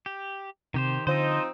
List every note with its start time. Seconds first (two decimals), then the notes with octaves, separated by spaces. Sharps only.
0.06 G4
0.74 C3 D#3 G4 C5
1.07 D3 F3 C4 D#4 C5 D#5